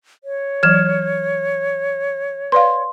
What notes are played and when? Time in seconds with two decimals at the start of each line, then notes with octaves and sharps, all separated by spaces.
0.24 C#5
0.63 E3 F#3 F6 G#6 E7
2.52 B4 D5 F5 C6